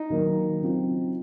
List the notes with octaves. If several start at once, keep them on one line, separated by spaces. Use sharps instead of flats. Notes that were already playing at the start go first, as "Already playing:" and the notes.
Already playing: D#4
D#3 F#3 A#3
C#3 F#3 C4 F4